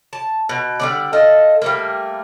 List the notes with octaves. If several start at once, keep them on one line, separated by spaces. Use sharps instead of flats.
A5
B2
D3 G3 D5
F4 A4 D#5
G3 A3 A#3